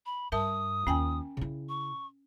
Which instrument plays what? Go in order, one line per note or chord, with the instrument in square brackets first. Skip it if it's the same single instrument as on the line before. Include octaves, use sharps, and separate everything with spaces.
[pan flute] B5
[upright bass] G2 [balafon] A#4 E5 A5 [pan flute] D#6
[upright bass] D#2 F4 [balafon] C#4 G5 G#5
[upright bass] C#3 E4
[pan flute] C#6